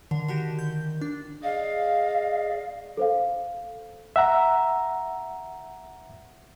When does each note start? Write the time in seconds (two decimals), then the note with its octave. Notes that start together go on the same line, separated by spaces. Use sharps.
0.11 D3 D#3
0.28 D3 F#4 G4
0.59 G6
1.01 D4
1.43 G#4 D5 D#5 F5
2.97 A4 C5 F5
4.16 E5 F#5 A#5